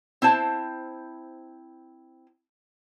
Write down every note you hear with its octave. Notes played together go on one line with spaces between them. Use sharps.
C4 E4 C5 A5